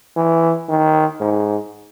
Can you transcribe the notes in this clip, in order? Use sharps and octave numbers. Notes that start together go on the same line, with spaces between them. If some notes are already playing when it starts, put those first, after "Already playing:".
E3
D#3
G#2